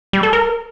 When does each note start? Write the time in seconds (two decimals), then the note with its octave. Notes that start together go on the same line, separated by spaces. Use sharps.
0.13 G3
0.23 A4
0.33 A#4